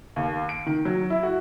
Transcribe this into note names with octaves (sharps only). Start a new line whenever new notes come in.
D#2
D7
D#3
F#3
E4
F#4